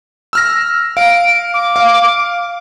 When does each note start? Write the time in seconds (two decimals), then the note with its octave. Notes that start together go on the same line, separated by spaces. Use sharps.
0.33 E6 F6 A#6
0.97 F5 D7
1.54 D6
1.76 F5